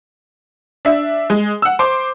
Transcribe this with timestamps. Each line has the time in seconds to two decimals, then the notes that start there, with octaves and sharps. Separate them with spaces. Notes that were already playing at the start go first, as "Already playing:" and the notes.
0.85 D4 E5
1.30 G#3
1.62 F#5 E6
1.79 C5 C6 D6